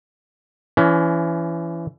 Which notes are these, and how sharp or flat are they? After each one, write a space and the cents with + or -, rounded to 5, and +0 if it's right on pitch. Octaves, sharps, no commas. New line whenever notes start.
E3 +25 C#4 +35